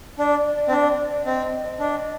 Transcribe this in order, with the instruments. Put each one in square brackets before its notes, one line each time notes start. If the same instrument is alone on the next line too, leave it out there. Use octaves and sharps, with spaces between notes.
[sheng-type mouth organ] D4 [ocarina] D5
[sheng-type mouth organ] C4
D4
[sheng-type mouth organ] C4 [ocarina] D#5
[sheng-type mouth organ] D4